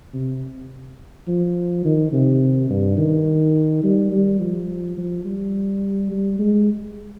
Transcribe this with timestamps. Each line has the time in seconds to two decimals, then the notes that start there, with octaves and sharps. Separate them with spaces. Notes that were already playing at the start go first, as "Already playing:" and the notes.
0.14 C3
1.28 F3
1.85 D#3
2.12 C3
2.70 G2
2.98 D#3
3.83 G3
4.12 G3
4.40 F3
4.97 F3
5.25 G3
6.11 G3
6.39 G#3